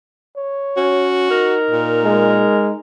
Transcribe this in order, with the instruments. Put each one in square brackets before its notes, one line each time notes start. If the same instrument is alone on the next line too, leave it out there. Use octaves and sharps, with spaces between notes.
[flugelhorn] C#5
[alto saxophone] C#4 [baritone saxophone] F#4
[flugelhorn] D#4 [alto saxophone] A#4
[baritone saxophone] A#2
[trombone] G#3